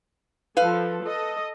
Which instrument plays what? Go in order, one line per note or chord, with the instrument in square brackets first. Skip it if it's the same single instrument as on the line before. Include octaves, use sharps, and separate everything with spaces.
[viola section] F3 A4 [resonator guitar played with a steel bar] B4 F5
[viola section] A4 D#5